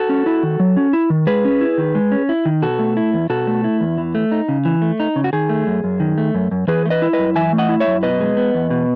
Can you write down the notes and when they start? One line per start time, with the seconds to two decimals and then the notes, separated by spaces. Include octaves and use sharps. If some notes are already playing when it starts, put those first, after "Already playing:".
Already playing: F#4 A4
0.09 C#4
0.26 E4
0.43 D#3
0.60 F#3
0.77 C#4
0.93 E4
1.10 D#3
1.27 G#3 G#4 B4
1.45 C#4
1.61 E4
1.78 D#3
1.95 G#3
2.12 C#4
2.29 E4
2.46 D#3
2.62 B2 F#4 A4
2.79 A3
2.97 E4
3.14 E2
3.30 B2 F#4 A4
3.47 A3
3.64 E4
3.81 E2
3.98 E3
4.15 A3
4.32 D#4
4.49 C#3
4.65 E3
4.82 A3
5.00 D#4
5.16 C#3
5.24 F#4
5.33 D#3 G#4
5.49 A3
5.67 F#2
5.84 F#2
6.00 D#3
6.18 A3
6.35 F#2
6.51 F#2
6.67 E3 G#4 B4
6.86 A3
6.90 B4 D#5
7.02 E4
7.13 B4 D#5
7.19 F#2
7.36 E3 E5 G#5
7.53 A3
7.58 D#5 F#5
7.69 E4
7.80 C#5 E5
7.87 F#2
8.03 B2 B4 D#5
8.20 G#3
8.37 B3
8.55 E2
8.71 B2